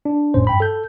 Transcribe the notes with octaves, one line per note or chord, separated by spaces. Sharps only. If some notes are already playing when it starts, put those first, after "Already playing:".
D4
G1 F2 A2 C#4 C5
G2 G5 B5
A4 G6